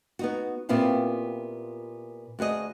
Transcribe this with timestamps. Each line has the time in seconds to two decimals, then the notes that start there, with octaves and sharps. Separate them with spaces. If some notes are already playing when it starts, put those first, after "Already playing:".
0.19 B3 D#4 F#4
0.69 A#2 B3 C4 E4 F4 G4
2.39 D2 F#4 G#4 D#5